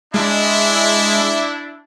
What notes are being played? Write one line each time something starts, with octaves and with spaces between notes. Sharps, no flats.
G#3 D4 E4